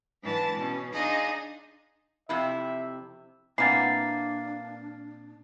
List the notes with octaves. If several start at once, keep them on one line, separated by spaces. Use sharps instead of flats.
G#2 E3 D4 A5 A6
B2 C#4
D4 D#4 F4 G#4 D#5
F2 C3 E4 E5
A#2 E3 A#3 C4 D4 F#5 A6 C7